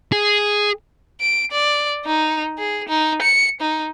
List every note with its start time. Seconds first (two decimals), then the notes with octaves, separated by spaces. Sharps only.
0.12 G#4
1.21 D7
1.51 D5
2.05 D#4
2.58 G#4
2.89 D#4
3.22 C#7
3.61 D#4